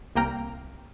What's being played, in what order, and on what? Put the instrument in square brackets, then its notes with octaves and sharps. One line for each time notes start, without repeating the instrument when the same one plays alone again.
[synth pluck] C2 A#3 G5 A#5 F6